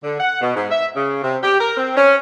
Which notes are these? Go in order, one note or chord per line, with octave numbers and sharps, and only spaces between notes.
D3
F#5
B2
G#2
E5
C#3
C3
G4
A#4
C4
C#4